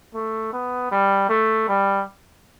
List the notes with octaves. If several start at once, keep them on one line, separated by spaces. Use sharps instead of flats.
A3
B3
G3
A3
G3